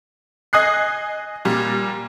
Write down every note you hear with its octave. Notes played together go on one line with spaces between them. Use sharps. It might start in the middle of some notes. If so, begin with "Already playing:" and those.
D#5 G#5 D#6 F#6 C7
A#2 G3